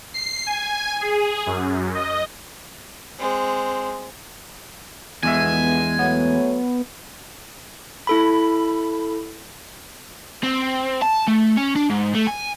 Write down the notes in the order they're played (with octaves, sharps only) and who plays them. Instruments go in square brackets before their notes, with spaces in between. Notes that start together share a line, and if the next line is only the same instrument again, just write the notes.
[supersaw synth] C7
G#5
G#4
F#2
D#5
[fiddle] G#3 C4
[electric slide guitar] E2 G#3 E5 [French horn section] D3 F3 B3 [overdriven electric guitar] G#5
[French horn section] F#3 A3 C#5 [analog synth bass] B3
[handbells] E4 A4 B5
[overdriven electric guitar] C4
A5
A3
C#4
D4
G#2
A3
G#5